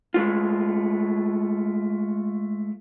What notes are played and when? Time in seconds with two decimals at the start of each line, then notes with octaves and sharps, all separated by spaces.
0.14 G#3 A3 F4